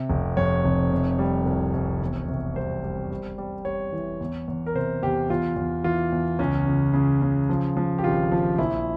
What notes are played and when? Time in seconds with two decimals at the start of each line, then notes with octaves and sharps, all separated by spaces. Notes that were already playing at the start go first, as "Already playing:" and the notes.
Already playing: C3
0.10 F1
0.37 F2 C#5
0.64 F1
0.91 C3
1.19 G3
1.46 C2
1.74 C2
2.02 E1
2.28 C3
2.55 G3 C5
2.84 G3
3.10 G3
3.38 G3
3.65 G3 C#5
3.92 E3
4.21 E2
4.48 E2
4.66 A#4
4.75 C3 C5
5.03 E2 G4
5.30 E2 F4
5.57 E2
5.84 E3 F4
6.13 E2
6.39 C#2 C#4
6.66 C#3
6.94 C#3
7.22 C#3
7.49 F3
7.77 F3
7.98 G4
8.04 G#1 F4
8.31 F3
8.58 A#1 E4